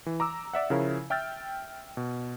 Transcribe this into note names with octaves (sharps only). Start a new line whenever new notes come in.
E3
A#5 D6 E6
D5 E5 F#5
C#3 F3 E4 A#4 C#5 F5
E5 G5 E6 F6 G6 A6
B2